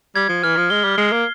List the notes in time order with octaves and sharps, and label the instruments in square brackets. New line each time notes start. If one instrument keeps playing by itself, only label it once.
[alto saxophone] G3 [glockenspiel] G#6
[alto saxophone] F3
[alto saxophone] E3 [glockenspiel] F6
[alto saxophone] F3
[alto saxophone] G#3 [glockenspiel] G7
[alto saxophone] G3
[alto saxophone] G#3 [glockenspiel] C7
[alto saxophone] A#3